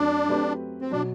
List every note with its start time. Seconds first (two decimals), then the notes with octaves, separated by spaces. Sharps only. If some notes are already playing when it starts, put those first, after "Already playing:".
Already playing: F#2 F#3 A3 C4 D4
0.28 F#3 A3 C4 G4 B4
0.81 C4
0.91 B2 F#3 D4